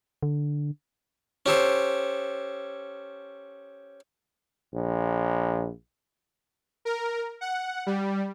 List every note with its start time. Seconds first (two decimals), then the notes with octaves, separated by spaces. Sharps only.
0.23 D3
1.46 C#4 G4 A4 C5
4.74 A#1
6.85 A#4
7.41 F#5
7.86 G3